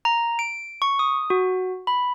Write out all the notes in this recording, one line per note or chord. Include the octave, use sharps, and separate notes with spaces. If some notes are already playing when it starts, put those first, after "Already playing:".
A#5
D7
C#6
D#6
F#4
B5